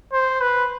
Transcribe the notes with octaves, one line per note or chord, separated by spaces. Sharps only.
C5
B4